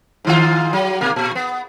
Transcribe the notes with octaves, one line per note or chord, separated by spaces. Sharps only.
G#2 D#3 F4
F#3
B2 A#3
A#2
B3